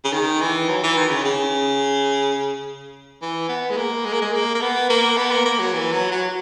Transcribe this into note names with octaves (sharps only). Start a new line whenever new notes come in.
C#3
D#3
E3
F#3
E3
D#3
C#3
C#3
E3
B3
G#3
A#3
G#3
A#3
G#3
A#3
A#3
B3
A#3
B3
A#3
A#3
F#3
E3
F#3
F#3